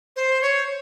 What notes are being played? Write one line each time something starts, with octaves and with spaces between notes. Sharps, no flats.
C5
C#5